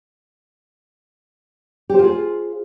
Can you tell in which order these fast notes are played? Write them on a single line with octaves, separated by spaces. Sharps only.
G4 C5 F4 G#4